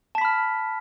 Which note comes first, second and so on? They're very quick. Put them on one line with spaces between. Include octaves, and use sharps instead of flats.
A5 B6 B5 F6